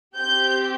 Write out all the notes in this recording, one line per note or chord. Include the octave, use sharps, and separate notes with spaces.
C4 G4 G6